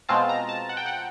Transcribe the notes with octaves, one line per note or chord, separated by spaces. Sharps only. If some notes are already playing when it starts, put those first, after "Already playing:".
B2 G#3 C4 F4 A5
A#5
A5
F#5
G5
F#5